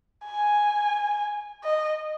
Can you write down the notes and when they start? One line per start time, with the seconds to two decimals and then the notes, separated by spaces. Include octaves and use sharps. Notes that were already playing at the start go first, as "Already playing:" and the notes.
0.25 G#5
1.64 D#5